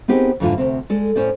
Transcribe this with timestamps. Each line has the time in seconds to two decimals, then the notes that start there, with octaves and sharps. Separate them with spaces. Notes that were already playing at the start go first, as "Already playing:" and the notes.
0.08 B3 C4 D#4 G4 G#4 A#4
0.40 F2 G#2 D3 E3 F4
0.58 D2 C3 C4
0.90 G#3 A4 D5
1.16 A2 C#4 C5 D5